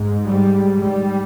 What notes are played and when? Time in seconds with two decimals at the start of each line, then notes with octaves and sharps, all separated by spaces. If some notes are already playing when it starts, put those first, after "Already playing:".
Already playing: G#2
0.25 G3
0.82 G3